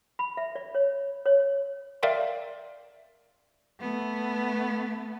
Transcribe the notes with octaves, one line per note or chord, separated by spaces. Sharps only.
B5
E5
D5
C#5
C#5
A#4 D5 E5 F5 G5 C6
A3 B3